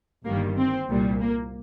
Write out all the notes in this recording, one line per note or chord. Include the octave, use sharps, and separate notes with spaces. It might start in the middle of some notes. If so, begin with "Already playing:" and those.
G1 G2 D#3 G3 A#3
C4
C2 A#2 G3
A#3